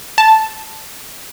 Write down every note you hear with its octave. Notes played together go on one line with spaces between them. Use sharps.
A5